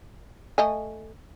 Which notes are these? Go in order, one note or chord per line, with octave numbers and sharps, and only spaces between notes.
A3 D#5 G#5